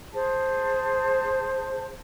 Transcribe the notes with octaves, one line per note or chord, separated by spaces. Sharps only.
G#4 C5 A5